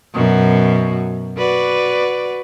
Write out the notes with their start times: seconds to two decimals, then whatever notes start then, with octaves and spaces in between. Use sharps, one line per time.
0.14 F#2 B2 F#4
1.37 F#4 B4 D5